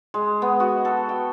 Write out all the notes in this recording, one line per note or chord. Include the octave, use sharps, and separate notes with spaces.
G#3
B3
F#4
A4
G5